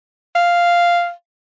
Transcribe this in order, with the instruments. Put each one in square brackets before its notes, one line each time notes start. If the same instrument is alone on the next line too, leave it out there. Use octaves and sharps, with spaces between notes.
[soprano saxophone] F5